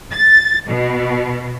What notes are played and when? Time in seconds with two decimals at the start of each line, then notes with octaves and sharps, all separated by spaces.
0.13 A6
0.68 B2